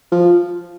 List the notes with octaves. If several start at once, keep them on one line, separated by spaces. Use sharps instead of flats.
F3